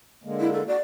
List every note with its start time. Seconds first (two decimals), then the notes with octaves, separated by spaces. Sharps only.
0.24 D3 G#3 A#3
0.40 E4
0.53 A4
0.68 F#4 D5